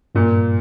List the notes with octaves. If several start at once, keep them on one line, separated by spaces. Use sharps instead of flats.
G2 A#2